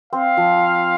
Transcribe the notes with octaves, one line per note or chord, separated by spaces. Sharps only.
C4 F5
F3